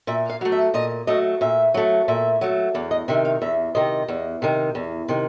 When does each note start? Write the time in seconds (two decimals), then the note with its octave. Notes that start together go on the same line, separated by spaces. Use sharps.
0.07 A#2 E5
0.30 F5
0.41 F#3 A3
0.52 E5
0.74 A#2 D#5
1.07 F#3 A3 D#5
1.41 A#2 E5
1.74 F#3 A3
2.08 A#2 E5
2.41 F#3 A3
2.74 E2 D5
2.91 D#5
3.08 C3 D#3 E5
3.25 F5
3.42 E2 E5
3.75 C3 D#3 D#5
4.08 E2
4.42 C3 D#3
4.75 E2
5.08 C3 D#3